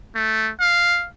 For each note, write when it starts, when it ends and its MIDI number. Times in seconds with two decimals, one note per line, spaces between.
0.15 0.51 57
0.60 1.07 77